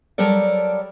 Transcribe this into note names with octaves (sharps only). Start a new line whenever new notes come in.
F#3 G3 A4 A#4 D5